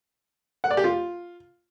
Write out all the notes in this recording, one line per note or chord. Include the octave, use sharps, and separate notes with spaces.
F#5
D5
G4
F4